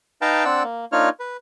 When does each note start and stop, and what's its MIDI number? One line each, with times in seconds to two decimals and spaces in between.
0.22 0.44 63
0.22 0.44 71
0.22 0.44 77
0.22 0.44 79
0.22 0.44 81
0.22 0.44 82
0.45 0.63 60
0.45 0.63 62
0.45 0.63 74
0.45 0.63 78
0.45 0.63 88
0.63 0.85 58
0.92 1.09 58
0.92 1.09 62
0.92 1.09 63
0.92 1.09 65
0.92 1.09 73
0.92 1.09 89
1.20 1.37 71